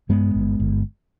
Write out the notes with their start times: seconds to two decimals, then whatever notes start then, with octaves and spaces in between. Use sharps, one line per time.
0.09 G2 G#3 B3
0.35 G1
0.60 G1